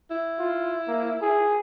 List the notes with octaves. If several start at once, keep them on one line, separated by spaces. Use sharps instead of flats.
E4
F4
A#3
G#4